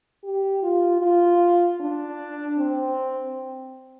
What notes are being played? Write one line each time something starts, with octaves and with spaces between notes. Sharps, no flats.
G4
F4
F4
D4
C4